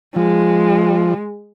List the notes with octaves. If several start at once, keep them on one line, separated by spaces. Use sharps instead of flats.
F3 G#3